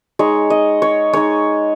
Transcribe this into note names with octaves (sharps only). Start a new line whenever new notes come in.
G#3 D#4 C#5
D#5
C#5
G#3 D#4 C#5